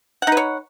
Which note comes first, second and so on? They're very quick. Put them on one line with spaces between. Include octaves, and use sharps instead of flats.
F#5 D#4 B4 C#5